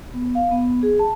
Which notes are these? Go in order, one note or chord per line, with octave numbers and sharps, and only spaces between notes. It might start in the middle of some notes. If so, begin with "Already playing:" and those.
B3
F5
B3
G#4
A5